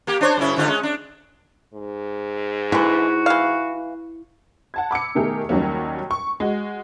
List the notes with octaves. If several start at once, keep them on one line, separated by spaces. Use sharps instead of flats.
A#3 G4
D4 C5 C#5
F#2 C#3 E4
G#2 D3 F4
G#3 C#4
D4
G#2
D3 E3 E4 F#4
E3 F5
F#5 A5 G#6
B5 D6 E6 C#7
B2 D#3 A3 G4 G#4 A#4
D#2 D#3 F#3 G3 A#3 C#4
C#6
G#3 F#4